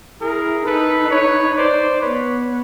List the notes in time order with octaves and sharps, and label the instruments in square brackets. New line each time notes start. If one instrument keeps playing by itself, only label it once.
[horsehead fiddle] E4 [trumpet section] G#4 A#4
[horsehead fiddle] D#4 [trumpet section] A4 B4
[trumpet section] B4 C#5
C5 D5
[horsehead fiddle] B3 [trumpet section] B4 C#5